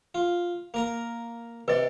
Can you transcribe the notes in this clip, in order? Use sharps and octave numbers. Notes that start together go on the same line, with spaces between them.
F4
A#3 A#4 A#5
C3 B4 D5 D#5